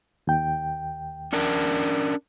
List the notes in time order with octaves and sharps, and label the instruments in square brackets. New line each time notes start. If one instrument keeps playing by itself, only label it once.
[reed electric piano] D#2 G5
[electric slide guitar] C#4 D4 A#4